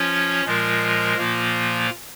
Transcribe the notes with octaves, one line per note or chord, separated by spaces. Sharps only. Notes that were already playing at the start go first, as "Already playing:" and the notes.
Already playing: F3 C#4 F4 C#5
A#2 F3 G#3 F4 A#4
A#2 F3 A#3 F4